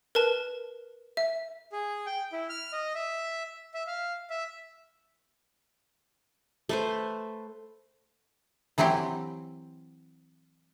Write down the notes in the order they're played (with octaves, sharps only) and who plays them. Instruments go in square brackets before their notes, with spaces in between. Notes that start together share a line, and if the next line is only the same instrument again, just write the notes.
[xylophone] A#4 B4 A5
E5
[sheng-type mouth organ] G#4
G5
E4
F6
D#5
E5
E5
F5
E5
[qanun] A3 B4 C5
[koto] E3 F#3 C4 E4 G4